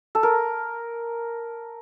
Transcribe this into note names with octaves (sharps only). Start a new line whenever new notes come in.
A4
A#4